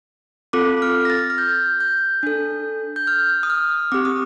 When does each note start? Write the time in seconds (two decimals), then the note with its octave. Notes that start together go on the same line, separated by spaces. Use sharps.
0.53 C4 F4 A4 D6
0.82 F6
1.05 A#6
1.10 A6
1.30 F6
1.38 G6
1.80 G6
2.23 D4 A4
2.96 G6
3.07 F6
3.43 D#6
3.50 F6
3.92 C4 G4 D6
4.05 D#6